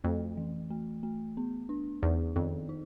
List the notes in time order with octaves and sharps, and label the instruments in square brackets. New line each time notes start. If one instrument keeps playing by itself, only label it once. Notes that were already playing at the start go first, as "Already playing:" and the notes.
[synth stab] F2 [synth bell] A3
[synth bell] E3
A3
A3
B3
D4
[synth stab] E2 [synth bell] D#4
[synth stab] F2 [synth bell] D#3
[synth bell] D#4